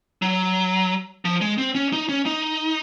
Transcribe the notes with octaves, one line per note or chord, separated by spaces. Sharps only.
F#3
F3
G#3
C4
C#4
D#4
C#4
D#4